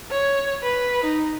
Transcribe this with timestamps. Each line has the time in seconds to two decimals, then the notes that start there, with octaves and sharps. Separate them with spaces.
0.11 C#5
0.62 B4
1.04 D#4